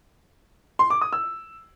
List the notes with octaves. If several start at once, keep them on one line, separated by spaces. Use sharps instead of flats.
C6
D6
D#6
E6